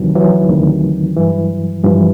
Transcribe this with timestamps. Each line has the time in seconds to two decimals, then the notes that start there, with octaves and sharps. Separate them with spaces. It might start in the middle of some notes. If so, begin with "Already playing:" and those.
Already playing: D2 C3 D#3 E3 F#3
0.15 E3 F#3
0.49 D2 C3 D#3
1.17 G2 E3
1.84 G2 E3 F3